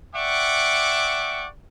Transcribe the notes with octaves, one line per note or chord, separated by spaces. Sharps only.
D5 E5 F#5 G5 C#6 D6